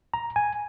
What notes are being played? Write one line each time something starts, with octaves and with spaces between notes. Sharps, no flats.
A#5
G#5